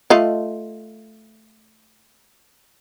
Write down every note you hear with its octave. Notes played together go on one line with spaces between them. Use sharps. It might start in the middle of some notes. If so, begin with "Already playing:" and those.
A3 F4 D#5